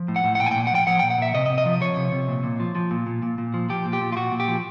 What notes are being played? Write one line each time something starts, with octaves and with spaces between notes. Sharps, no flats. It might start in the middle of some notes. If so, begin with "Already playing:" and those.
Already playing: F3
A2
F#5
A2
F#5
A#2 G5
G#5
G5
A#2
F#5
F3 G5
F3 F#5
G5
A#2
F#5
A#2 E5
C3 D#5
D#5
C3
D#5
F3
F3 C#5
C3
C3
A#2
A#2
F3
F3
A#2
A#2
A#2
A#2
F3
F3 G4
A#2
G4
A#2
F4
A#2 F#4
A#2
G4
F3